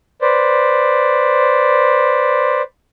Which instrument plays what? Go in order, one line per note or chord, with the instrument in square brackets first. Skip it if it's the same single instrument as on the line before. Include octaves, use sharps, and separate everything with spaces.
[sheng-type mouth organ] B4 C5 D5